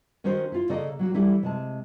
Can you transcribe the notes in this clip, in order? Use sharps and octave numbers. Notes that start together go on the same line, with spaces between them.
D#3 C#4 F#4 A#4 C5 D#5
E4 F4
C#3 A#3 A4 D5 D#5
F#3 A#3 F#4
E3 G3 E4 A4
C3 G#3 A5